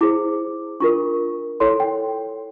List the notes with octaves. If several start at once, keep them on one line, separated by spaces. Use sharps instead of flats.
E4 G#4 C5 D6
D4 F4 A#4 C#6
E4 A4 C#5 C6
G5